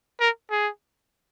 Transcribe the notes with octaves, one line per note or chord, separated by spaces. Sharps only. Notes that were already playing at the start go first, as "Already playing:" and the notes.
A#4
G#4